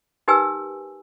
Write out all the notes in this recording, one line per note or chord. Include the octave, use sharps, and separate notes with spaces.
D#4 G4 A#4 B4 G#5 E6